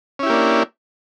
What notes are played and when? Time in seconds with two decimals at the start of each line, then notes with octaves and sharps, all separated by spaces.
0.19 C#4
0.23 E4
0.26 G4
0.30 A#3
0.33 D4